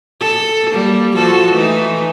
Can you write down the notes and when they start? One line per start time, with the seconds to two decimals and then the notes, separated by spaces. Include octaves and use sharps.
0.21 A4
0.71 G3 A#3
1.16 F3 F#4 A4
1.54 E3 A3 D#4